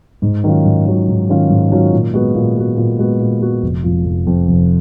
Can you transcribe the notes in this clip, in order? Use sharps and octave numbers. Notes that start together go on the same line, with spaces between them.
G#2
D#3 F#3 C#4 F4
G#2
D#3 F#3 C#4 F4
G#2
D#3 F#3 C#4 F4
G#2
D#3 F#3 C#4 F4
A#2
G#3 B3 F#4
A#2
G#3 B3 F#4
A#2
G#3 B3 F#4
A#2
G#3 B3 F#4
F1
F2 F3
F1
F2 F3
F1